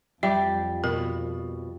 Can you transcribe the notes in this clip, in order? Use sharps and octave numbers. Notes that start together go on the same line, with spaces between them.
F2 G3 G4 E5
B2 A#4